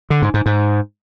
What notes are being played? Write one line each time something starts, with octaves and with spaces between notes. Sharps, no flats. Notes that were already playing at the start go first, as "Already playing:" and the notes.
D3
G#2
G#2
G#2